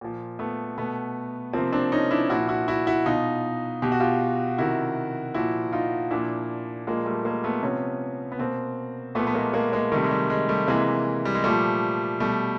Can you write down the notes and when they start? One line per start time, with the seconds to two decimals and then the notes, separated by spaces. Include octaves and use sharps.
0.01 A#2 F3
0.39 A3 B3
0.77 B2 A3 B3
1.53 C3 F3 A#3 C4
1.72 C4 D4
1.92 C#4 D#4
2.11 D4 E4
2.30 A#2 F3 E4 F#4
2.49 E4 F#4
2.68 E4 F#4
2.87 E4 F#4
3.06 B2 D#4 F4
3.82 B2 G4
3.92 F#4
4.00 F4 G4
4.58 C3 D#3 E4 F#4
5.34 A#2 F3 E4 F#4
5.72 D#4 F4
6.11 A#2 F3 D4 E4
6.87 A#2 F3 G#3 A#3
7.06 G3 A3
7.25 G#3 A#3
7.44 A3 B3
7.63 C3 F3 B3 C#4
8.32 B3
8.39 B2 A#3 C4
9.15 A#2 A3 B3
9.20 F3
9.27 B3
9.34 G#3 A#3
9.53 G#3 A#3
9.73 G#3 A#3
9.92 C3 D#3 G3 A3
10.04 G#3
10.11 G3
10.30 G#3
10.49 G3 A3
10.68 C3 E3 G#3 A#3
11.25 G3
11.35 G#3
11.44 A#2 F3 G3 A3
12.20 B2 G3 A3